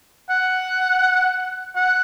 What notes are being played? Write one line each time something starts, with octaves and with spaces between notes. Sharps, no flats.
F#5
F#5